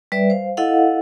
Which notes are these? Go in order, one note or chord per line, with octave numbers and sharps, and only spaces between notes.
G3 B4 D5 E5
C5 F5
E4 A4 D#5 F5 F#5